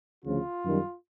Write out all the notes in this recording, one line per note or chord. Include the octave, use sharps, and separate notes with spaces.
D2 C#3 F3 F4
F#2 D#3 G3